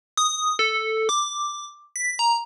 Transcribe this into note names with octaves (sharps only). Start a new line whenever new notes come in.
D#6
A4
D6
B6
A#5